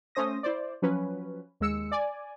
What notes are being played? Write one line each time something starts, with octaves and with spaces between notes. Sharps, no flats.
A3 C#4 C5 D#6 A#6
E4 C5 D5
F3 F#3 C#4 B4
D#2 G#3 E6 C#7
D5 G#5